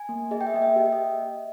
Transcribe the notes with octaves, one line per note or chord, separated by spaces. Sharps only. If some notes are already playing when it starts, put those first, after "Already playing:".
Already playing: G#5
A#3
G#4 D#5
G5
E5
A#3 D#5
E5
G4 G5
E5
D#5